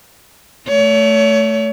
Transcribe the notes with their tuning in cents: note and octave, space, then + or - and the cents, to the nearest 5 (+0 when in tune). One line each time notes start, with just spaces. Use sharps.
A3 +0 C#5 +35